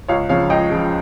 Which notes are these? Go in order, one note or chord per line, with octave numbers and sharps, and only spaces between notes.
C#2 C#5 F5
C#3 F3 C#5 F5
C#2 D#5 G5
C#3 F3